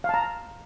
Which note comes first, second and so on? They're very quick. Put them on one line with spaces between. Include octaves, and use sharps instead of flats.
F5 A5 A#5